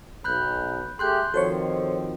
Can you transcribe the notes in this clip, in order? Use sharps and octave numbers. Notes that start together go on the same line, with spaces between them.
B1 B5 F#6 G6
A3 G4 G#4 C6 F#6 G6
D#3 F3 C4 F#4 A4 C5 C#5